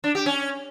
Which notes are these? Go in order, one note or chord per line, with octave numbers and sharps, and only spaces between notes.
D4
G4
C#4